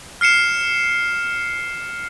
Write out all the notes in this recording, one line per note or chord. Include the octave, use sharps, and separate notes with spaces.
F6 C7 C#7 E7